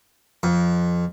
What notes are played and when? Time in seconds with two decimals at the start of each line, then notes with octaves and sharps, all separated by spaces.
0.43 F2